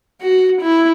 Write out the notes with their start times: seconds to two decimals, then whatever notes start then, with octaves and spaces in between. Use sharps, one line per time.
0.21 F#4
0.62 E4